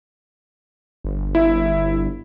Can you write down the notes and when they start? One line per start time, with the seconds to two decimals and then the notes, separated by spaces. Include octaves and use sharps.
1.04 G1
1.35 E4